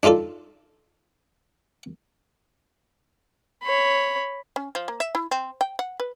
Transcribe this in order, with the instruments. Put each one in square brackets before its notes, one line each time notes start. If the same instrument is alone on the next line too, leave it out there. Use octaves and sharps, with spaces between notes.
[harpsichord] D4 D#4 F4 A4 D5
[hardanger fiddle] C#5 B5
[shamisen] C#4
F3
A#3
E5
E4
C4
G5
F#5
B4